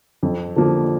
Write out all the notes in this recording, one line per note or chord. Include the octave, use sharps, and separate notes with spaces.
F2
D3 F3 A#3